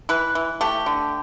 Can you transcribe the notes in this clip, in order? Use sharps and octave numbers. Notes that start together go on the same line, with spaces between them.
E3 B4
E3
A3 G4
D3